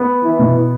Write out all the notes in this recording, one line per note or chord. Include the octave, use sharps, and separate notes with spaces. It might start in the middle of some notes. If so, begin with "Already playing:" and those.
Already playing: B3
E3
B2